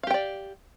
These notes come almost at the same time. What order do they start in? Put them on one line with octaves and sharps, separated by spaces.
F5 G4 G5 D5